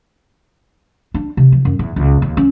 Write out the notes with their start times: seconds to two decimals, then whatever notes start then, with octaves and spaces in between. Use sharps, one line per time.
1.14 D4
1.37 C3
1.52 F3
1.65 F#2
1.79 E2
1.96 C#2
2.22 D#2
2.37 C#4